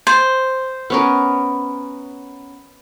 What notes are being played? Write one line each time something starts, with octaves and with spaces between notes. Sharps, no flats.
C5
B3 C#4 A#4